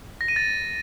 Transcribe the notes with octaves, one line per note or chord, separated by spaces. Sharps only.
A#6
D#7
A6